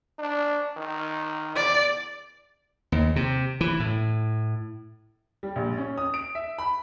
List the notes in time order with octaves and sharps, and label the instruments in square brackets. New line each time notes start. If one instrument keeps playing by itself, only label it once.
[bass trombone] D4
D#3
[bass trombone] E2 [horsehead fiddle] D5
[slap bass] D#2
C3
E3
A2
[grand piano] G3
A#1
C#4
D#6
D7
E5
B5